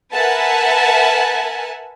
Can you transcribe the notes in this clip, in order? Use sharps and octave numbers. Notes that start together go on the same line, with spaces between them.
A#4 B4 E5 F#5 G#5 A5